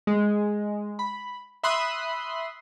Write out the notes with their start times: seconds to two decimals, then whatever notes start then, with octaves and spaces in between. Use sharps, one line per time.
0.07 G#3
0.99 B5
1.63 E5 B5 C6 D#6 F#6